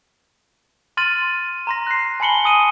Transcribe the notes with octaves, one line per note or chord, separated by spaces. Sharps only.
C6 F6 A6 D#7 F#7
A#5 C6 A#6
F#6 C7
G#5 A5 B5 C#7 F#7 G7
G#5 D#6 D#7